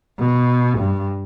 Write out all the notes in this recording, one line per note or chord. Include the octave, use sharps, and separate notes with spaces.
B2
G2